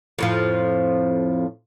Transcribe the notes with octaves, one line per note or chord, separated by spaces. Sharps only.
F2 A2 F3